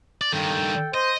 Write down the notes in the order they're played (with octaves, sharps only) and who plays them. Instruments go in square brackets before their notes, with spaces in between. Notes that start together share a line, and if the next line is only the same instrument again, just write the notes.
[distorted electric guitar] D5
[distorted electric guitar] G2 D#3 [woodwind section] A4 G5
[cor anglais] C5 [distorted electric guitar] D#5